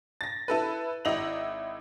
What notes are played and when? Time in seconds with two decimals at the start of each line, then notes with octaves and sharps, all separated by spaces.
0.21 A6 A#6
0.48 E4 A4 B4
1.05 G#1 E4 D#5 A#6 F7 F#7